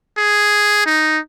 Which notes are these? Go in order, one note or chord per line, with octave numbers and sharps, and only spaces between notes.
G#4
D#4